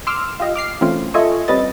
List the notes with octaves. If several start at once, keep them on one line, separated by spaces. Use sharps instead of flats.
C6 D6 E6 F6
F4 G4 D#5 F5
D6 F6 C7
E3 A3 C4 C#4 F4
F4 A4 D#5 E5 G#5 C#6
G3 C4 C#4 B4 D#5 A6